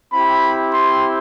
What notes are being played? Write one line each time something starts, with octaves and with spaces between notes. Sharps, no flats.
C4 E4 G4 B5
C6